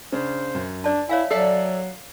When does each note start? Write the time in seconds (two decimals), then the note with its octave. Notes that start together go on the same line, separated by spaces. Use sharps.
0.12 C#3 C#4 D4 C5
0.55 F#2
0.84 D4 D5 A5
1.09 E4 C#5 E5 F5 G#5
1.31 F#3 A4 D5 E5 C7